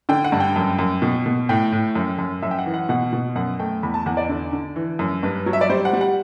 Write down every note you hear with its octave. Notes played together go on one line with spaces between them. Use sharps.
D3 G5
F#5
G2
G5
F#2
F#2
B2
B2
A2 G5
A2
F#2
F#2
F#2 E5
G5
F#5
E3
F#5
B2 F#5
B2
F#2 F#5
A3 G5
E2 B5
A5
E2 F#5
D5
D3
D3
E3
F#2
G2 B4
F#3
E5
D5
G3 C5
F#5
G3
F#5